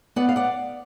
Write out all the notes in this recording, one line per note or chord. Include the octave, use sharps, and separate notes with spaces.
B3 D5 F#5
F5
D5 F#5